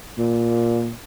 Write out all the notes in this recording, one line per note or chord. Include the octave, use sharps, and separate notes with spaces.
A#2